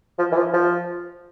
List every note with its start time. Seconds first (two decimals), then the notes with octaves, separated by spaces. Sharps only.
0.19 F3
0.32 E3
0.37 F3
0.54 F3